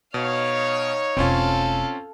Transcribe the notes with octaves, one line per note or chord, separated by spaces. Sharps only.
B2 D#4 C#5 F5
E1 A3 C4 C#4 F4 A4 F5